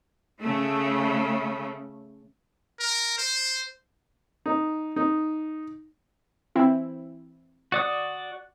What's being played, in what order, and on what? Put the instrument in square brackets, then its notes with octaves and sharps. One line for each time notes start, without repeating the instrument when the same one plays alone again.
[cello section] C#3 A3
[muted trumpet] A#4
C5
[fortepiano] D#4
D#4
[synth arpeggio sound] E3 C4 E4
[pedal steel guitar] F#4 D5 D#6